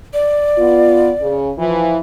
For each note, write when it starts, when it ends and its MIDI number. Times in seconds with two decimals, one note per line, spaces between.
0.13 1.34 74
0.58 1.11 59
0.58 1.11 65
1.21 1.52 49
1.59 1.99 52
1.59 1.99 53